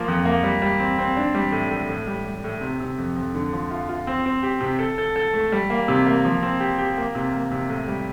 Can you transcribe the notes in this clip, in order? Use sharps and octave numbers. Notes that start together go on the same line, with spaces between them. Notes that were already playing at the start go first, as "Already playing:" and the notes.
Already playing: F3 A#3
F2
A#3
G3
G3
C4
C4
D4
G3
A2
A2
A2
G3
G3
A2
C3
C3
F2
F2
D3
F3
F4
F4
C4
C4
G4
C3
A4
A4
A4
A3
G3
A#3
C3
A#3
F3
C4
G4
G4
A#3
C3
A#3
C3
A2
G3